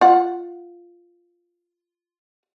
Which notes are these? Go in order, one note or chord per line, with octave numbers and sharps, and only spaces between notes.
F4 F#5